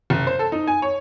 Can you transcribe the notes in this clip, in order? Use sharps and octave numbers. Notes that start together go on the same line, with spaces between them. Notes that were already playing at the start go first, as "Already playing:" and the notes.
F#1
C5
A4
D#4
G#5
C#5